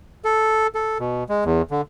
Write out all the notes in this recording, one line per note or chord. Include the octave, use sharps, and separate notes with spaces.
A4
A4
B2
G#3
E2
D3